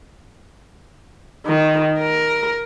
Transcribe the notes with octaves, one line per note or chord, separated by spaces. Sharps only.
D#3
A#4